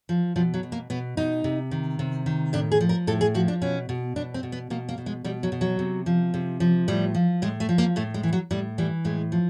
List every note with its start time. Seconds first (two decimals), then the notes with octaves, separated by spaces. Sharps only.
0.09 F3
0.36 B2 F3
0.54 F#3
0.63 B2
0.72 A#3
0.90 B2 B3
1.17 B2 D#4
1.44 C3
1.71 D#3
1.99 C3
2.26 D#3
2.53 A2 D4
2.72 G#4
2.81 F3
2.89 A#4
3.07 A2 A4
3.21 G#4
3.34 F3 F#4
3.48 D4
3.62 B2 C#4
3.89 B2
4.16 B2 D4
4.34 C4
4.43 B2
4.52 B3
4.70 B2 A#3
4.89 A#3
4.98 B2
5.06 G#3
5.24 B2 G3
5.43 F#3
5.52 B2
5.61 F#3
5.79 C3
6.06 F3
6.34 C3
6.60 F3
6.88 A2 G3
7.15 F3
7.42 A2 G#3
7.60 A3
7.69 F3
7.78 A#3
7.96 A2 A3
8.14 G#3
8.23 E3
8.33 F#3
8.51 A2 G3
8.78 E3 G3
9.05 A2 G#3
9.32 F3